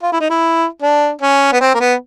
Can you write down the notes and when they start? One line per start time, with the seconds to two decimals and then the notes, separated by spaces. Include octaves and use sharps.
0.03 F4
0.12 E4
0.20 D#4
0.30 E4
0.82 D4
1.21 C#4
1.52 B3
1.61 C4
1.74 A#3
1.80 B3